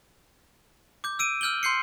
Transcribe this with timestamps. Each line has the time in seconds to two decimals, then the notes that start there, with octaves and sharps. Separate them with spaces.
1.04 D6 G6
1.19 E6 D7 D#7
1.41 E6 F6 G6 F#7 G7
1.63 C6 G6 C7 C#7